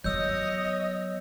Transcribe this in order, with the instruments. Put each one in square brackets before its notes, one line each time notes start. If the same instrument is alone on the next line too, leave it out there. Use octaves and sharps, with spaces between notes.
[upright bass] F#3 B3 [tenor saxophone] C#5 [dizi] D#5 [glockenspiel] E6 G6